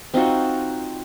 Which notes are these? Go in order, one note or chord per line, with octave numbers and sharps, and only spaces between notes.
C4 D#4 F4 F#4